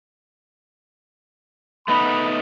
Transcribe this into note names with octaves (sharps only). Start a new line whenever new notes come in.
A3 B3 D#4 F#5 B5